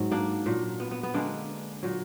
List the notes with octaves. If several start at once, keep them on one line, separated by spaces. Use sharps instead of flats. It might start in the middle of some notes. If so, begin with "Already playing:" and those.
Already playing: G#2 F#3
A#3 D4
A#2 F#3
B3
B3
B3
D3 G#3 A#3 D4
A#2 F#3